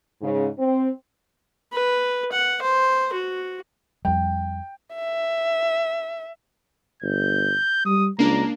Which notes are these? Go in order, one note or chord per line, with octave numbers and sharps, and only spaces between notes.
G#2 C#3
C4
B4
F#5
C5
F#4
F2 G3 G5
E5
G1 G6
G3 D#6
C#2 A#3 D4 A#5